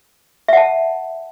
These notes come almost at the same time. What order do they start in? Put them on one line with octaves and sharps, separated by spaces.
E5 F#5 A5